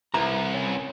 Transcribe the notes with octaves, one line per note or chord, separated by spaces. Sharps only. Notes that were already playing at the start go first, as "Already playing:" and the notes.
C2 E3 A#5
C#4